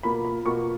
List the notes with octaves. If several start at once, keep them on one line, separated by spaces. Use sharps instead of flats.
B2 A#3 F4 B5
B5
B2 A#3 F4 C#6